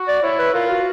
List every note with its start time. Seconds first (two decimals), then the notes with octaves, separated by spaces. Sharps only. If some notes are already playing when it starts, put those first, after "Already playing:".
Already playing: F#4
0.08 D5
0.23 E4 C#5
0.39 B4
0.54 F4 A#4
0.70 F#4